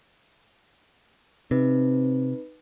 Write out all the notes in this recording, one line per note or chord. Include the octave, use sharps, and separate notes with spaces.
C3 C4 D#4 B4